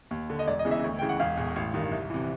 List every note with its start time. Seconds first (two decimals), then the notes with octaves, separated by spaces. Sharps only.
0.11 D#2
0.30 D3
0.39 D#5
0.47 E1 D5
0.59 D#5
0.65 E2 C#3 E3
0.71 E5
0.84 D2
0.99 C#3 E3 G5
1.09 F#5
1.20 E1 F5
1.37 E2 B2
1.56 A1
1.74 G2 D#3
1.92 C2
2.10 C3 E3